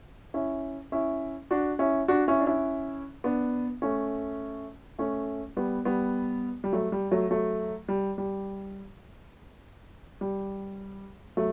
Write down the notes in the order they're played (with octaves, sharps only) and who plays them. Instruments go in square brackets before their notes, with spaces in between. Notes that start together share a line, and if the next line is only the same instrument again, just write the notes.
[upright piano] C#4 E4
C#4 E4
D4 F#4
C#4 E4
D4 F#4
C#4 E4
D4
C#4 E4
B3 D4
A3 C#4
A3 C#4
G3 B3
G3 B3
G3
F#3 A3
G3
F#3 A3
F#3 A3
G3
G3
G3
F#3 A3